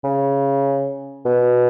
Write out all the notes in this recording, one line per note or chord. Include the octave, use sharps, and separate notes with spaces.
C#3
B2